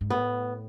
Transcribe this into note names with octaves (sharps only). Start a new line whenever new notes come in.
G#2
A2 B3